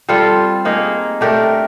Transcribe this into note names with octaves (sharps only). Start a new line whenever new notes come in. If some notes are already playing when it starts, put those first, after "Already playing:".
G3 C4 F4 A4
A#3 D#4 G#4
A3 D4 G4 A#4